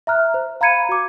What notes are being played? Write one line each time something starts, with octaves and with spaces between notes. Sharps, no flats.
E5 A#5 F6 F#6
C5
F5 A#5 B5 G#6 C#7 D#7
F#4 D6